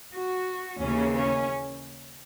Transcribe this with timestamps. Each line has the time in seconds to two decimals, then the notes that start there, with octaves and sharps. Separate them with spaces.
0.15 F#4
0.81 D#2 C#3 E3 A#3 C#4
1.15 C#4